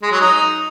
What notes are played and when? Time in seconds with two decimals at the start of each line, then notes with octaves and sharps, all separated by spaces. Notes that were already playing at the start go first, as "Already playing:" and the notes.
0.02 G#3
0.11 F#3
0.21 D#4